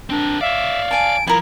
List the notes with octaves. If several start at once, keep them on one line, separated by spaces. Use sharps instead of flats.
C4 D4 A#4
C#5 D5 E5 F5
G#5 A5 D7
F3 E4 A#4